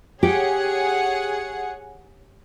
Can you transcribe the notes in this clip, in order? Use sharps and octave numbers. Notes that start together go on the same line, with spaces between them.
G4 G#4 C#5 F#5